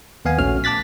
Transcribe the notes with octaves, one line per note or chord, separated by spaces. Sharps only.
D#2 B3 F5 G#5
A#1 A3 C#4 F#4 F6
A5 D6 F#6 A6 B6